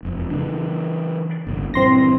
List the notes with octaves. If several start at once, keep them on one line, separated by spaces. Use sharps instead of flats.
E1 F2
C#3 E3 D4
G1 C2 D3
A#1 G2 E3 C4 C6 A#6